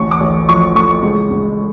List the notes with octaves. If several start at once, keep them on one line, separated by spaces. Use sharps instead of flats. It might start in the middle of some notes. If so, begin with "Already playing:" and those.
Already playing: A1 D2 C#6
D6
A1
F3 C#6
A2 C#6
C#2
C#2